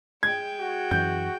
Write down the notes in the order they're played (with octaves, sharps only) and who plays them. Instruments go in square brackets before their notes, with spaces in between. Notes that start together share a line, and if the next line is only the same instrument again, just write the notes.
[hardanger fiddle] G#3 G5 [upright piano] G#6
[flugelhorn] F#4
[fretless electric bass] F#2 E3 [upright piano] G6